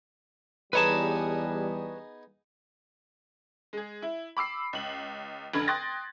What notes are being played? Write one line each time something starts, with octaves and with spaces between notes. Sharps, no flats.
E2 G3 B3 D#4 G#4 B4 C#5 A5
G#3 G#4
E4
B5 D6 E6 C7
C#2 F#7
F1 D3 B5 G#6
G5 C6 D#6 F#6 A6 A#6